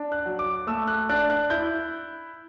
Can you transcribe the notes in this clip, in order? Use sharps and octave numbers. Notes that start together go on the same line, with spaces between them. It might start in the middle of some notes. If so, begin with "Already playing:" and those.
Already playing: D4
F#6
F#3
D6
A3 E6
F#6
D4 F#6
F#6
E4 G6